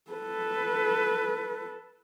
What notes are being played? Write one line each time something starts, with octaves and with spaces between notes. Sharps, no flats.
A4 B4